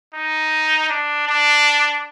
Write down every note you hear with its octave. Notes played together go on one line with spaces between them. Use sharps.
D#4
D4
D4